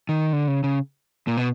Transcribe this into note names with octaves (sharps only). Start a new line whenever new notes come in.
D#3
D3
C#3
C#3
A#2
B2